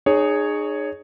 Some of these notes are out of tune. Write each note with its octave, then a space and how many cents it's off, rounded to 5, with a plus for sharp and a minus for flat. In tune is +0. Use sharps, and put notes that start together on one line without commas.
D#4 -40 G#4 +0 C#5 +0